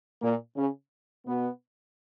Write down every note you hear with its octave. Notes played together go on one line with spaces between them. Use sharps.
A#2 A#3
C#3 C#4
B2 B3